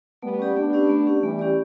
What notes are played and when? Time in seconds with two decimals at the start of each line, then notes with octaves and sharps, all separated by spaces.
0.22 G3 A3 B3
0.39 C#4 G4 D5
0.56 A3 B3 D4
0.73 C#4 G4 D5
0.89 A3
1.07 C#4 G4 D5
1.23 E3 G3 A3
1.39 C#4 G4 D5